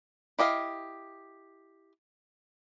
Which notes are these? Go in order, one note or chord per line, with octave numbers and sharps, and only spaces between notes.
E4 G4 D#5 F5